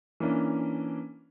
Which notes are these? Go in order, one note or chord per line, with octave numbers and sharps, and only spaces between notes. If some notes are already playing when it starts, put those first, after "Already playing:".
E3 A#3 C#4 D4